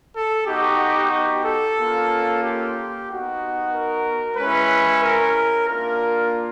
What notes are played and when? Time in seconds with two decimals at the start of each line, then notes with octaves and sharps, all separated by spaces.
0.14 A4
0.46 B3 D#4 F#4 G4
1.11 G4
1.44 A4
1.76 A#3 C#4 F4
2.42 G4
3.07 B3 D#4 F#4
3.72 A#4
4.37 G#3 C#4 E4 B4
5.02 A#4
5.68 A#3 D4 F4 A#4